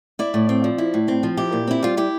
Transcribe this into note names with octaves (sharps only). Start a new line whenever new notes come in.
E4 D5
A2
C4
F3
E4
A2
C4
F3
E4 G4
A#2
C4 E4
G3 F4
E4 G4